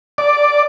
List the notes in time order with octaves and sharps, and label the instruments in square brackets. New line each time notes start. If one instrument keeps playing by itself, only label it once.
[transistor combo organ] D5